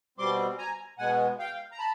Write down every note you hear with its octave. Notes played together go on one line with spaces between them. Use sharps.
B2 G3 C4 C6 D6
G#5 A#5
B2 G#3 B3 F#5 G#5
F5 G5
A#5
A5 B5